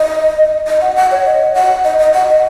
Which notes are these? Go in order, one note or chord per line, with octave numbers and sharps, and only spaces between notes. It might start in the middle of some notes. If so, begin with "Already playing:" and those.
Already playing: D#5
D#5
F#5
F#5
C#5
D#5
F#5
D#5
D#5
F#5
D#5